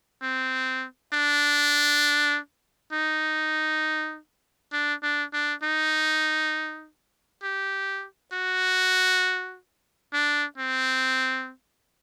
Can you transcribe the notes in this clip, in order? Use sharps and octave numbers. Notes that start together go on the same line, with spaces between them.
C4
D4
D#4
D4
D4
D4
D#4
G4
F#4
D4
C4